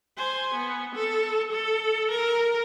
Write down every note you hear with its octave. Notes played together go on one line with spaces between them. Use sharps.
C5 G#5
B3
A4
A4
A#4